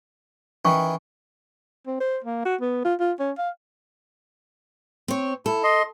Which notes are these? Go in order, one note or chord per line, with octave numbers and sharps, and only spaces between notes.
D#3 E3 C#4 C#6
C4
C5
A#3
F#4
B3
F4
F4
C#4
F5
C4 C#5
E4 A4
D#5 C6